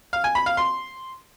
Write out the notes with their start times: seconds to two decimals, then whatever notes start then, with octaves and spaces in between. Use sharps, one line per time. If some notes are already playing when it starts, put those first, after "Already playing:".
0.13 F5
0.24 G#5
0.35 B5
0.46 F5
0.57 C6